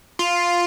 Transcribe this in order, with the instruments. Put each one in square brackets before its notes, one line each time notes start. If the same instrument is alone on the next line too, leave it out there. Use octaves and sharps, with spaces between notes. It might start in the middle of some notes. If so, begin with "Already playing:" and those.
[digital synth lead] F4